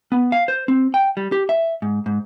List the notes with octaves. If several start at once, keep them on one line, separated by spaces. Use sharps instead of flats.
B3
F5
C5
C4
G5
G3
G4
E5
G#2
G#2